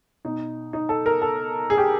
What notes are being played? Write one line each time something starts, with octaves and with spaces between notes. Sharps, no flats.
B2 D#4
D#4
A4
A#4
A4
G#4
G4